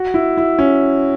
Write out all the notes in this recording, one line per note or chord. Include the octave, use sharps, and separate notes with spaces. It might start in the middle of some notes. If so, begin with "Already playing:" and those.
Already playing: F#4
E4
E4
C#4